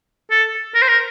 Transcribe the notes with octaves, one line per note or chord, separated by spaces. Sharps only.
A4
A#4
C5
A#4